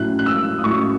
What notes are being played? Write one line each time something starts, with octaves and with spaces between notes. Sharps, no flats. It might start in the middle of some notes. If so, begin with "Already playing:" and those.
Already playing: A2 F#3 C#4 E4 F#6
F#6
E6
D#6
A2 F#3 C#4 E4 C#6